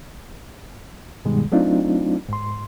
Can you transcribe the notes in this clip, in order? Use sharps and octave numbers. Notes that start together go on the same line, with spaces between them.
G2 B2 D#3 G3 G#3
F#3 A3 C4 D4 D#4 F4
G#2 C6